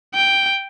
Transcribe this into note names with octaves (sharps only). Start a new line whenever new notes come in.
G5